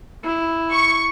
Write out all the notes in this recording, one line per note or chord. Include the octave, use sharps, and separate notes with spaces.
E4
C#6